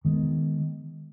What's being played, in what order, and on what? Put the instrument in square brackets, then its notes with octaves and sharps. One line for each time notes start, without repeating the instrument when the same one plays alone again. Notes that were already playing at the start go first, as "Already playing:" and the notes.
[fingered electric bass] D#3 G#3 B3